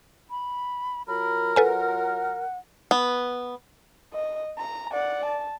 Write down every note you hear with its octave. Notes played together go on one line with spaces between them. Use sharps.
B5
F#3 F4 A#4 B5
A4 B4 F#5 G#5
B3
D#5
A#5
D5 F#5
A5